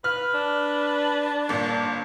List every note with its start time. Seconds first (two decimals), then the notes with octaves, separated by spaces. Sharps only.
0.04 B4 F6
0.34 D4
1.49 G1 A#2